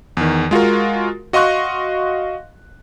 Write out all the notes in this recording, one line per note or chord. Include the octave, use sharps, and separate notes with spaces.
E2 D#3
G#3 F4 F#4 A#4
F#4 D#5 F5 C6 C#6 F#6